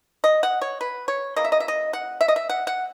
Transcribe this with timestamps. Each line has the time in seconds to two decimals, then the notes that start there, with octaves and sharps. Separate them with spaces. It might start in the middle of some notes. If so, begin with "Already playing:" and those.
0.24 D#5
0.43 F#5
0.61 C#5
0.81 B4
1.08 C#5
1.36 C#3 E3 A#3 D#5
1.45 E5
1.52 D#5
1.60 E5
1.68 D#5
1.93 F#5
2.21 E5
2.28 D#5
2.36 E5
2.49 F#5
2.67 F#5